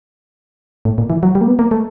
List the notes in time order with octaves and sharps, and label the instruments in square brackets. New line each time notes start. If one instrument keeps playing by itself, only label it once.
[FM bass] A2
A#2
E3
F#3
G3
A#3
B3
A#3
A3